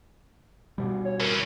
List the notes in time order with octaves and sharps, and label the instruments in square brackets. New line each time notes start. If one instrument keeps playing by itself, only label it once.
[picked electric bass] B2 G3
[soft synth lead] C#5
[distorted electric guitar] E3 C#4 [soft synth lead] A#4